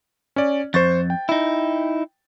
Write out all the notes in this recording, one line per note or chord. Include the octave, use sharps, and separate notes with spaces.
C#4 D5
F2 C5 C#6 A6
G5
D#4 E4